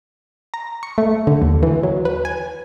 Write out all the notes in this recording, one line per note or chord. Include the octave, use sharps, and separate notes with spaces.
A#5
C#6
A3
D3
D#2
E3
F#3
B4
G#5